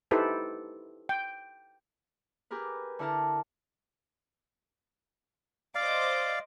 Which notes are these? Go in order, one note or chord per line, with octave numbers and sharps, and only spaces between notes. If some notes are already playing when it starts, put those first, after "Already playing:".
D#4 E4 G4 A4 B4 C5
G5
G4 G#4 A#4 B4
D3 E4 A#4 A5
C5 D5 D#5 F5 D6